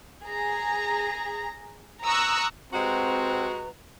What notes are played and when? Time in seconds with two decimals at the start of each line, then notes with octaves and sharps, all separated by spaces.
0.24 G#4 A#5
2.04 A#5 C#6 D#6 E6 F#6
2.73 C3 G#3 C4 F#4 B4 A#5